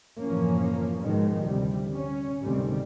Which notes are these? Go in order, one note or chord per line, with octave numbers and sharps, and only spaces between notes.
F#1 A2 E3 F3 A#3 C#4
G#2 B2 D#3 F3 G#3
D2 C3 G3
C#4
D2 G#2 C3 D#3 G3 C4